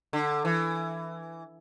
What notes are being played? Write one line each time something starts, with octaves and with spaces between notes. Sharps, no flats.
D3
E3